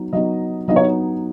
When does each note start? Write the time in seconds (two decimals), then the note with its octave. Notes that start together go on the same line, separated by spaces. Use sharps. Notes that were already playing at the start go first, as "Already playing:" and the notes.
Already playing: F#3 B3 D#4
0.13 F#3 B3 D#4 D#5
0.68 F#3 B3 D#4 D#5
0.76 C#5